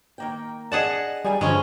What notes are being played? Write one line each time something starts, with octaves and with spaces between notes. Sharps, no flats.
D#3 A#3 G5
D4 G#4 D#5 F#5 A5
G3 G#4 G#5 A#5
G2 D3 F3 G#3 C#4